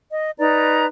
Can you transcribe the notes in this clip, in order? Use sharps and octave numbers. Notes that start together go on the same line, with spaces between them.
D#5
D#4 B4 D5 A#5